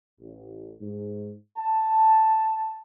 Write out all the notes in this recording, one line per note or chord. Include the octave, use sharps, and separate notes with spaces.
A1
G#2
A5